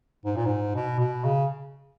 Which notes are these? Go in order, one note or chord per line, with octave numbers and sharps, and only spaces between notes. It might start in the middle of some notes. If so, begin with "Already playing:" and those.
G#2
A#2
G#2
B2
B2
C#3